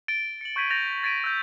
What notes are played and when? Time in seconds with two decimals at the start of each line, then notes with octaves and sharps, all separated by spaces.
0.08 A6 D7 G7
0.41 C#7 F#7
0.56 C#6 G6 G#6 B6 D#7 F#7
0.70 G6 A6 A#6 F7 F#7
1.03 G#6 A6 B6 D7 D#7
1.24 E6 G6